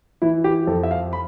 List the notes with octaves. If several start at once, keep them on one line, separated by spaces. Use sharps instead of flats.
E3 E4
G4
F2 A4
E5
F5
B5